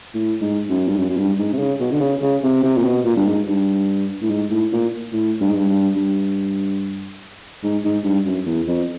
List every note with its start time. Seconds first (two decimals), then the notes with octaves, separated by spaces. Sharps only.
0.14 A2
0.41 G#2
0.69 F#2
0.88 G2
0.96 F#2
1.09 F#2
1.17 G2
1.39 G#2
1.53 C3
1.59 C#3
1.80 B2
1.91 D3
2.00 C#3
2.22 C#3
2.43 C3
2.63 C3
2.77 A#2
2.85 B2
3.04 A#2
3.16 G2
3.25 G#2
3.47 G2
4.22 A2
4.30 G#2
4.50 A2
4.72 A#2
5.13 A2
5.41 G2
5.49 G#2
5.55 G2
5.69 G2
5.96 G2
7.63 G#2
7.84 G#2
8.04 G2
8.25 F#2
8.46 E2
8.67 F2